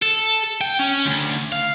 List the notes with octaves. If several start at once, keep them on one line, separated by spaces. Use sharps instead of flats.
A4
G5
C#4
D2
F5